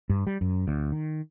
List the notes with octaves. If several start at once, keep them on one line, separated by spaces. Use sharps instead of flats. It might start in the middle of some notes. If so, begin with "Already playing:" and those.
G2
G3
F#2
D2
D#3